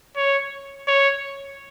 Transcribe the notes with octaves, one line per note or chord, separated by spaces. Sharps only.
C#5
C#5